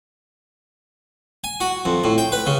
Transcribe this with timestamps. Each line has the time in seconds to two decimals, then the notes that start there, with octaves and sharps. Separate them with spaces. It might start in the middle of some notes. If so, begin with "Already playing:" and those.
1.44 G#5
1.60 F#4
1.85 F2
2.04 A2
2.18 G5
2.32 B4
2.46 C#3